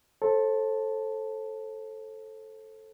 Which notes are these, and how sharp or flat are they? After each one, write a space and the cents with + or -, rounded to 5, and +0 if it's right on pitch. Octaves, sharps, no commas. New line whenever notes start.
A4 +0 C5 +35 A5 +0